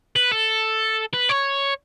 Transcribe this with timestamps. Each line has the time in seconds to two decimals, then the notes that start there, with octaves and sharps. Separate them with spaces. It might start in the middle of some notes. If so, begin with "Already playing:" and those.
0.16 B4
0.32 A4
1.13 B4
1.29 C#5